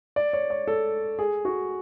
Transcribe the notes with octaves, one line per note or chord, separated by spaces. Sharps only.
D5
C#5
C#5
A4
G#4
F#4